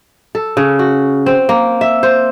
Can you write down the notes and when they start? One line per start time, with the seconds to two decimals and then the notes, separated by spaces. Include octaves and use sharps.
0.35 A4
0.57 C#3
0.79 F#4
1.26 C4
1.49 A#3
1.81 E5
2.03 C5